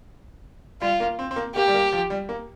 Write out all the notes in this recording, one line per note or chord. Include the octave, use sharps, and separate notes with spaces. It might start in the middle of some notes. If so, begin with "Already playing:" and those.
G3 F4
A#3
C4
C4
A#3
A#3 G4
G3
A#3
F3
G3
A#3